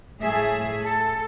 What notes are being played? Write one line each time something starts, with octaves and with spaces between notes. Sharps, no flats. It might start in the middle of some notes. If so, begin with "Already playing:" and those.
A2 A3 G#4 E5
A4